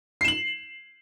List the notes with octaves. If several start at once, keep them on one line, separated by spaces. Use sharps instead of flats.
C7 E7 F#7